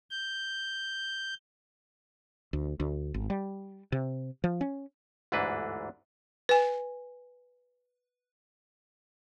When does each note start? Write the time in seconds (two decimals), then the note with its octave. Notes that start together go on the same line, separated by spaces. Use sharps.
0.10 G6
2.53 D2
2.80 D2
3.14 G#1
3.30 G3
3.92 C3
4.44 F3
4.61 C#4
5.32 G1 D2 G#2 E3 D4 B4
6.49 B4 G#5